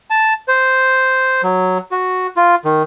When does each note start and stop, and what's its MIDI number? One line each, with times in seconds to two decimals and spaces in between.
0.10 0.34 81
0.48 1.42 72
1.43 1.78 54
1.91 2.27 66
2.37 2.55 65
2.65 2.83 51